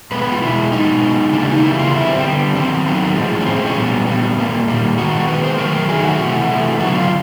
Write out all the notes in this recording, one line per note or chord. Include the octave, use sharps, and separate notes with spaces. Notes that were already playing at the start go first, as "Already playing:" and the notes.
B2 G#3 B3 B4
B4
F4
B2 G#3 B3 E4
B2 G#3 B3 D#4
B2 G#3 B3
C#3 E3 G3 A#3 D4
D#4
C#3 E3 G3 A#3 E4
F4
D3 G3 B3 E4
C4
D3 G3 B3
D#3 F#3 B3 C4
D#3 F#3 B3
A2 F3 G#3
C#4
A2 F3 G#3 C4
C4
C#4
A#2 G3 B3
A#2 G3 B3
A#2 G3 A#3
A#2 G3 A#3
D#3 G#3 B3 F#4
D#3 G#3 B3 B4
C5
D#3 F#3 A3 A#4
D#3 F#3 A3 G#4
F#4
C3 E3 A3
C3 E3 A3
D3 F#3 B3 F#4
F4